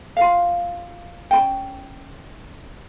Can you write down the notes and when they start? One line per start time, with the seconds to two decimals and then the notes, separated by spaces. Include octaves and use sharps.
0.17 F4 F5
1.31 C#4 F4 G5